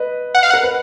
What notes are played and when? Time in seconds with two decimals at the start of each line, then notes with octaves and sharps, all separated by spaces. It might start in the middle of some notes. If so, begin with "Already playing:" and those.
Already playing: B4 D#5
0.35 F#5
0.43 F5
0.50 A#4 F#5
0.63 B4